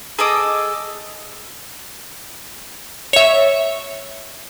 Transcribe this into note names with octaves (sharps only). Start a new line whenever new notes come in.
G#4 A4 D#5 D6
C#5 E5